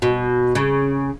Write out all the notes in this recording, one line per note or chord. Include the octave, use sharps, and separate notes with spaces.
B2
C#3